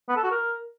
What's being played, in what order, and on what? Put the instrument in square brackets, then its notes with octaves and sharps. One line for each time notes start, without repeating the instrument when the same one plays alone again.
[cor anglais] B3
A4
F#4
A#4